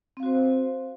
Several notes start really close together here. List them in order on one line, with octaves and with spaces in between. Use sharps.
C4 F5 F#4 C5